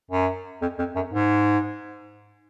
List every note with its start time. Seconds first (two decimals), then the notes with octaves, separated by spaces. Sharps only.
0.11 F#2
0.62 F2
0.79 F2
0.96 F#2
1.13 G#2